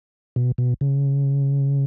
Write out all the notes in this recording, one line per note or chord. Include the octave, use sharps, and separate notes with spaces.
B2
B2
C#3